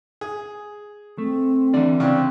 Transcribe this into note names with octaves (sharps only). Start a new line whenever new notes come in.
G#4
A3 C4
D3 E3 D5
C#3 C4 D4